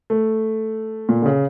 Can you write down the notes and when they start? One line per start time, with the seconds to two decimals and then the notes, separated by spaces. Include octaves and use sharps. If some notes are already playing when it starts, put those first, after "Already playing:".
0.10 A3
1.09 A#2
1.22 D3
1.26 C#3